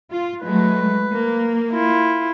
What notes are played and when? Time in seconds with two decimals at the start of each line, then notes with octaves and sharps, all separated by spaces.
0.10 F4
0.44 F#3 G#3 A3 B4
1.14 A#3
1.72 E4 F4